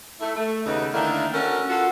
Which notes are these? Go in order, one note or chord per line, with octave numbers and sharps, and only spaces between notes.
A3 E4
A3
D#2 C#3 B3 D#4
D3 D#3 A3 A#3 D4 E4
C#4 D4 F#4 A4 A#4
F4 F#4 A4